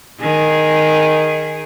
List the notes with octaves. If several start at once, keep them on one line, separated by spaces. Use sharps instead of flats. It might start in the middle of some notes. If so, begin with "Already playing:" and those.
D#3 G#4